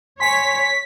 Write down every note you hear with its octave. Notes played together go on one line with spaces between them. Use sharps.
C#5 G#5 C6 B6